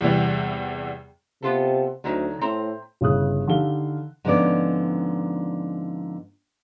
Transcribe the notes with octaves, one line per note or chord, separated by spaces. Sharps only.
E2 C3 E3 G3
C3 B3 F4 A4
D2 D3 D#3 F#3
A2 C4 C5 A#5
G1 C#3 E4 D#6 F#6
D3 D#3 G4 A4 F5 G7
G#2 D3 F3 B3 C#4 D5